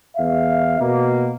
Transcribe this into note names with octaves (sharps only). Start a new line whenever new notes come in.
E2 E5 F5
B2 A#3